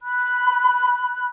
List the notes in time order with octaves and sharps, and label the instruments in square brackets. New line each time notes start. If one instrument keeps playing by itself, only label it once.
[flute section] B5 F#6